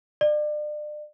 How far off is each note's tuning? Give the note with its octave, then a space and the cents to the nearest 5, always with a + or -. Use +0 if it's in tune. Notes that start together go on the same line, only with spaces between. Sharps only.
D5 +35